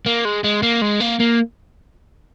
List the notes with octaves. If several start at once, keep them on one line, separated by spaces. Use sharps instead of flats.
A#3
G#3
G#3
A#3
G#3
A#3
A#3